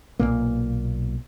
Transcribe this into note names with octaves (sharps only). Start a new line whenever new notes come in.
B1 E2 A#2 A#3